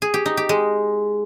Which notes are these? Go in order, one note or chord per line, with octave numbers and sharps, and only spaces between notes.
G#4
G4
D#4
G4
G#3